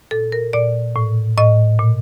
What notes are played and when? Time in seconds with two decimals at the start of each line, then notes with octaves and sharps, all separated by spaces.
0.11 A#2 A4
0.32 A#4
0.53 A#2 D5
0.96 A2
1.37 A2 D#5
1.79 A#2